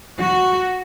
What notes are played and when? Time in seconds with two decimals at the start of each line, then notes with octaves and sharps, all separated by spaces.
0.18 F#4